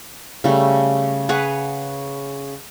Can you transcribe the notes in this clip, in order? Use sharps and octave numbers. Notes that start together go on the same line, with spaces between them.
C#3 G3 A3
G#4 B4 C#5 F#5